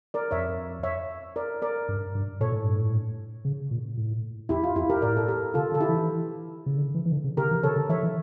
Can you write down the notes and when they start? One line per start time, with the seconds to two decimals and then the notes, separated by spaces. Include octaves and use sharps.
0.14 A#4 D5
0.31 F2 C#5 E5
0.83 C#5 E5
1.36 A#4 D5
1.62 A#4 D5
1.89 G2
2.15 G2
2.40 A#2 A4 C#5
2.52 A2
2.64 G2
2.76 A2
3.45 C#3
3.71 A#2
3.97 A2
4.49 F2 E4 G4
4.63 F4
4.76 F2 E4 G4
4.90 G4 A#4
5.02 A2 A#4 D5
5.17 A4
5.28 G4 A#4
5.54 C#3 F4 A4
5.72 D3
5.74 A4
5.80 E4 G4
5.89 E3
6.66 C#3
6.77 D3
6.94 E3
7.06 E3
7.12 D3
7.24 C#3
7.37 C#3 G4 A#4
7.51 E3
7.63 C#3 A4 C#5
7.76 D3
7.89 E3 C#5 E5
8.03 E3